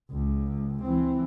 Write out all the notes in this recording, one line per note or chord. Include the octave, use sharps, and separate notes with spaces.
C#2
E3 C4